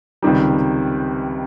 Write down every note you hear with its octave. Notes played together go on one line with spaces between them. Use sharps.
C#2 C3 D#3 G3